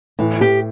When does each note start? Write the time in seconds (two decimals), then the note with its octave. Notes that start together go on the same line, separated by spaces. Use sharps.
0.19 A2 E3
0.41 G4